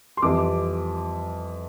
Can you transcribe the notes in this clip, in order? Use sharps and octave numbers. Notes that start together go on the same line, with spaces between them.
C6
F2 E3 G3 D6